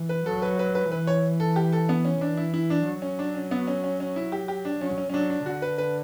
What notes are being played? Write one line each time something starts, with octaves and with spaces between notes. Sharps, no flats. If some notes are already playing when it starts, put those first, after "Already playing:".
Already playing: E3
B4
F#3 A4
B4
B4
B4
E3 B4
C#5
A4
G4
A4
B3
C#4
E3 D4
E4
E4
D4
F#3
C#4
D4
C#4
B3
C#4
C#4
C#4
E4
G4
G4
D4
F#3 C#4
C#4
C#4
F#3 D4
D4
D3 F#4
B4
B4